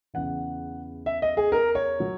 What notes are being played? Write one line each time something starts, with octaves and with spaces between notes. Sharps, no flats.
E2 C#3 E3 F#5
E5
D#5
G#4
A#4
C#5
F#3